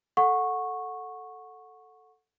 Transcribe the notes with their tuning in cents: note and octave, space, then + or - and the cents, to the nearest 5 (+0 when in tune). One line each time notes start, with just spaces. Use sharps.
A4 +0 F#5 -20 C#6 -10